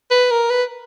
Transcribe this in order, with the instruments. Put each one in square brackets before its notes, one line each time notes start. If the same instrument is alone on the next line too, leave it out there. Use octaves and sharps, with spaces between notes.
[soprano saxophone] B4
A#4
B4